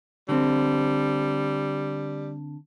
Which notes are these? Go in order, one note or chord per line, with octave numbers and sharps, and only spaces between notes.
D3 G3 C4